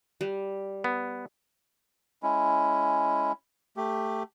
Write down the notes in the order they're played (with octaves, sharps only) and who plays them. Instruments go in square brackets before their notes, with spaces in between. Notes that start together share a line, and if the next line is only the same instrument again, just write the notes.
[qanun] G3
[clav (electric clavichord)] B3
[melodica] G#3 C#4 E4
A3 G4